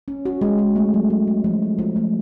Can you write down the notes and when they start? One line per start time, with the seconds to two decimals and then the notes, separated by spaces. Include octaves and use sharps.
0.08 C#4
0.25 F#4
0.41 G#3
0.59 F#4
0.76 A3
0.94 F#3
1.10 F#3
1.28 F#3
1.44 F3
1.62 F4
1.79 F3
1.96 A3